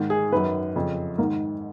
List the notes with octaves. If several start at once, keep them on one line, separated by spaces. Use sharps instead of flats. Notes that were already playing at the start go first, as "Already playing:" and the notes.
Already playing: G#2 D#3
G#4
F#2 D#3 B4
F2 C#3
G#2 D#3 A#4